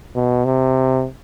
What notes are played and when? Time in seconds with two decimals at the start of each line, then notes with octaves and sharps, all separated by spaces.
0.15 B2
0.45 C3